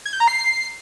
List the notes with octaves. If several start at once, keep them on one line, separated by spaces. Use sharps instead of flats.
G#6
G6
A#5
C7